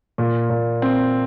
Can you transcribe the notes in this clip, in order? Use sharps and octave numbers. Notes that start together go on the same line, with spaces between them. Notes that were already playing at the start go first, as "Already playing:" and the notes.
A#2
A#2
C4